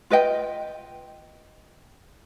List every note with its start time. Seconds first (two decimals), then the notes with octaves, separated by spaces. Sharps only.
0.10 F4 B4 D#5 G5